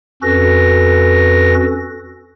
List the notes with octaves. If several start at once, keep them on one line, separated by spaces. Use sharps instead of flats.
F2 C#4 F#4 A4 B4 A#6